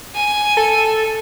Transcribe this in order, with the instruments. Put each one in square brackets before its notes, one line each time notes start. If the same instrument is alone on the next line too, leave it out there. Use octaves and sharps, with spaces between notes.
[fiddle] G#5
[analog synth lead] A4